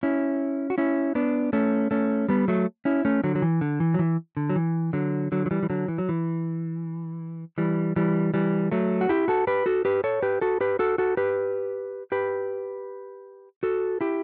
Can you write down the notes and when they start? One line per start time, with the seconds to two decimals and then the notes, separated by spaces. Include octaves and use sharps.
0.03 C#4 E4
0.70 F#4
0.78 C#4 E4
1.15 B3 D4
1.53 A3 C#4
1.91 A3 C#4
2.29 G3 B3
2.48 F#3 A3
2.85 C#4 E4
3.05 A3 C#4
3.24 D3 F#3
3.35 F#3
3.42 E3
3.61 D3
3.80 E3
3.94 F#3
3.99 E3
4.37 D3
4.50 F#3
4.56 E3
4.93 D3 F#3
5.32 D3 F#3
5.46 F#3
5.51 E3 G3
5.63 E3
5.70 D3 F#3
5.88 E3
5.98 F#3
6.09 E3
7.58 E3 G3
7.96 E3 G3
8.34 E3 G3
8.72 F#3 A3
9.01 F#4
9.09 E4 G4
9.28 F#4 A4
9.47 G4 B4
9.66 F#4 A4
9.85 G4 B4
10.04 A4 C#5
10.22 G4 B4
10.41 F#4 A4
10.61 G4 B4
10.79 F#4 A4
10.98 F#4 A4
11.17 G4 B4
12.12 G4 B4
13.63 F#4 A4
14.01 E4 G4